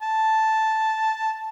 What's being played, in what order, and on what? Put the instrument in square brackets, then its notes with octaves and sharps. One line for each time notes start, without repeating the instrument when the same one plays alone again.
[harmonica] A5